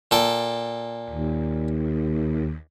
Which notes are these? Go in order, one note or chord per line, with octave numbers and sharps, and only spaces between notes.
A#2 A4 G5
D#2